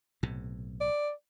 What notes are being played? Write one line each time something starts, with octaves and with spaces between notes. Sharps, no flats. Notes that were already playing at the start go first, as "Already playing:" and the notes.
B1 A2 C3
D5